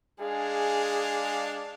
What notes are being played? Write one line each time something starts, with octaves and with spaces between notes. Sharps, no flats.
G#3 D4 G#4 F5